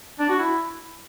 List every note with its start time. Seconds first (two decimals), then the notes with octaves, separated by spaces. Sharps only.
0.19 D4
0.29 F#4
0.39 E4